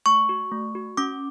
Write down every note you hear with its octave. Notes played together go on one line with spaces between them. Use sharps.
A3 C#6
F#4
A3
F#4
C#4 D6